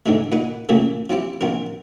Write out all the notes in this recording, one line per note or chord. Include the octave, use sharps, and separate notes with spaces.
G#2 D3 E3 G#3 A3
A#2 D#4 B4 F#5
C#2 A#2 C#3 E3 A3 A#3
F3 C4 E4 G4
A#1 B3 C4 A#4